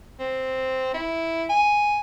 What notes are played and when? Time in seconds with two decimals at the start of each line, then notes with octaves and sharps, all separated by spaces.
0.19 C4
0.94 E4
1.50 G#5